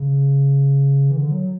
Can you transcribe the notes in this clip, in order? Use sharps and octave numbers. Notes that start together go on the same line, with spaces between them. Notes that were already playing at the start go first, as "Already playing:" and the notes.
Already playing: C#3
E3
D3
F#3